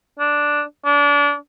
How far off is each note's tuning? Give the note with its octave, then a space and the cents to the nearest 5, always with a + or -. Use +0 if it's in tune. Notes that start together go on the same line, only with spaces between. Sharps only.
D4 +0
D4 -30